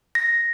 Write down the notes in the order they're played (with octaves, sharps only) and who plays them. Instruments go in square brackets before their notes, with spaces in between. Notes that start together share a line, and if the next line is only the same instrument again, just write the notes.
[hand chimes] A#6